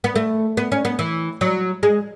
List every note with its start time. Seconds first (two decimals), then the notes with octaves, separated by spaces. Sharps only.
0.04 B3
0.16 A3
0.57 B3
0.72 C#4
0.85 B3
0.99 E3
1.41 F#3
1.83 G#3